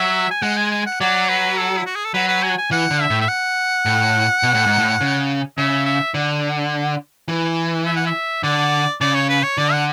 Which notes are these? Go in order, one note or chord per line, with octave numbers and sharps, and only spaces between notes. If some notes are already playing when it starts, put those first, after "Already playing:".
Already playing: F#3 E5
G#5
G#3 F#5
G#5
G#5
F#5
F#3 D5
B4
A4
E4
F#4
G#4
A4
F#3 B4
B4
G#5
G#5
E3 F#5
D3
E5
A2
E5
F#5
A2
B2
A2
G#2
A2
C#3
C#3 E5
E5
D3
E3
E5
F#5
E5
D3 D5
C#3 D5
C#5
B4
C#5
D3 D5
F#5